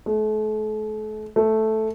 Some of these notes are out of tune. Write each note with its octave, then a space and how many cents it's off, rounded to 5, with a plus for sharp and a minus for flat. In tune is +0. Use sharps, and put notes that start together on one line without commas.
A3 -40
A3 -5